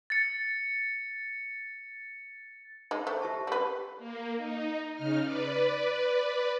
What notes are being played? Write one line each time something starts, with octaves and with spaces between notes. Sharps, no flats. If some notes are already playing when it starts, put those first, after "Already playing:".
A6 C#7
G#3 D#4
A3 C5
G4 E5 A5
G3 B4
A#3
D#4
C#3 D#4 F6
B4 D5